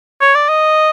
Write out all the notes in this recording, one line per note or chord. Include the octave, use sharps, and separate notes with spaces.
C#5
D5
D#5